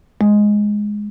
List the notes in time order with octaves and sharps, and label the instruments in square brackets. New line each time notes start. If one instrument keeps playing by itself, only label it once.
[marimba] G#3